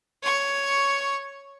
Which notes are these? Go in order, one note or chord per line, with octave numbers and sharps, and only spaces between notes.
C#5 C#6